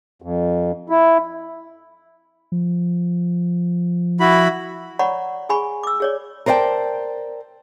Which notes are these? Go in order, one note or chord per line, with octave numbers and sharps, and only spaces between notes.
F2
E4
F3
E4 F#4 B5
C#5 D5 F#5 A#5 B5 C#6
G#4 G#5 B5 C#6
D6 E6
G#4 C#5 D5
A#4 C5 D5 F#5 G5 A5